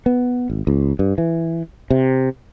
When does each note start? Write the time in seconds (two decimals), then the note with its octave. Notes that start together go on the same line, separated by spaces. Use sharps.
0.06 B3
0.50 G#1
0.67 C#2
0.99 G2
1.18 E3
1.91 C3